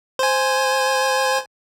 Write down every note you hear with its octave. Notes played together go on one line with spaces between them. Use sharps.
C5 G#5